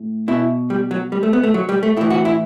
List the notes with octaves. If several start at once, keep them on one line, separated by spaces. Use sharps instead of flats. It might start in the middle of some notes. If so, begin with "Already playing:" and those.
Already playing: A2
B2 E4
G3
F#3
G3
A3
B3
A3
F#3
G3
A3
A2 E3 E4
F#4
E4